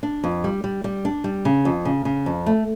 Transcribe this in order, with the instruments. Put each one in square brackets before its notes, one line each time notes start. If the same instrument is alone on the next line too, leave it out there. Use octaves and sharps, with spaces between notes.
[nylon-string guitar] D4
F2
G3
G3
G3
D4
G3
C#3
F2
C#3
C#3
F2
A3